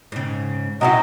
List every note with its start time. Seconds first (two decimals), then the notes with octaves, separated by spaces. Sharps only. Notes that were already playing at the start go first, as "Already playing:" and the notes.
0.12 G#2 C#3
0.81 C3 F#3 D#4 E4 D#5